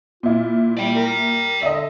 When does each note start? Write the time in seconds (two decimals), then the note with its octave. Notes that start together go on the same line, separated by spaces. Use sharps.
0.23 A#2 E4 F4
0.77 G3 D5 G5
0.95 A#4
1.63 D3 D#5 E5